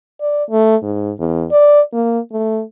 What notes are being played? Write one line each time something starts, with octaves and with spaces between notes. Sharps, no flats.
D5
A3
G#2
E2
D5
A#3
A3